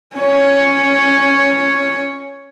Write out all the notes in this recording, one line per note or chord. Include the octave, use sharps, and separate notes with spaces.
C#4 C#5